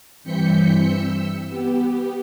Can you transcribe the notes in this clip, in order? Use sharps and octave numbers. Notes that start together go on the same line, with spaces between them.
G2 E3 C4 G6 B6 C#7
E6
B3 G4